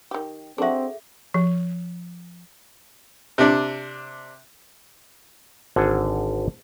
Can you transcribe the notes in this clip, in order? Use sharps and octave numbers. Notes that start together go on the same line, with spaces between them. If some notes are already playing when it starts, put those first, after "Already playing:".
D#3 G4
C4 D4 F#4 G#4 A4 E5
F3
C3 D4
G#1 D3 G#4 F#5 A5